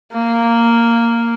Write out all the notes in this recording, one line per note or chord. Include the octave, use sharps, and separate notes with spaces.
A#3